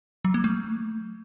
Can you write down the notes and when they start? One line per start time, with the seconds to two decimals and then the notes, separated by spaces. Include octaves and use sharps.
0.25 F#3
0.34 A#3
0.44 A3